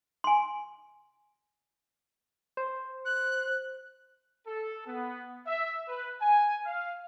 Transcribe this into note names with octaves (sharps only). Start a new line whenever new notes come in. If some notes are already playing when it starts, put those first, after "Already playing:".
G#5 C6
C5
F#6
A4
B3
E5
B4
G#5
F5